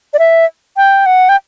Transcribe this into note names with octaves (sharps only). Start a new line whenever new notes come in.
D5
E5
G5
F#5
G5